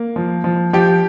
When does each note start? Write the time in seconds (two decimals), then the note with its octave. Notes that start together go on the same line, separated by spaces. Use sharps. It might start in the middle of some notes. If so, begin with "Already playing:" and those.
Already playing: A#3
0.16 F3
0.44 F3
0.73 F3 G4